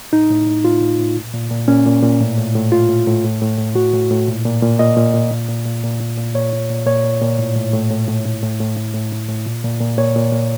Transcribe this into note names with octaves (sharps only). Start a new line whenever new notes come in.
A2 D#4
A2
A2
A2 F4
A2
A2
A#2
A#2
A#2
A#2 C#4
A#2
A#2
A2
A2
A2
A2 F4
A2
A2
A2
A2
A2
A2 F#4
A2
A2
A#2
A#2
A#2
A#2 D#5
A#2
A#2
A#2
A#2
A#2
A#2
A#2
A#2
A#2 C#5
A#2
A#2
A#2 C#5
A#2
A#2
A2
A2
A2
A2
A2
A2
A2
A2
A2
A2
A2
A2
A#2
A#2
A#2
A#2 C#5
A#2
A#2